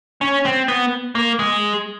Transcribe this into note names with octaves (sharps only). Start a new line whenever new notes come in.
C#4
C4
B3
A#3
G#3